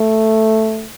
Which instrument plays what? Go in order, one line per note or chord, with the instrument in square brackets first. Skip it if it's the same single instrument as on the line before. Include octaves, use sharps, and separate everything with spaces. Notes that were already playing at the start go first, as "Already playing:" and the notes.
Already playing: [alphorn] A3